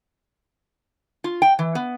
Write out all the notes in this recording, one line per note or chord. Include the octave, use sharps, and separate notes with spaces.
F4
G5
E3
B3